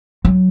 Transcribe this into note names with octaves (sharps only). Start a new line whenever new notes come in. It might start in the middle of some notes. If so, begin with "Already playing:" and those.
F#3